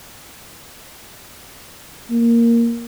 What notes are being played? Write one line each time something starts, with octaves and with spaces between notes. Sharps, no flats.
A#3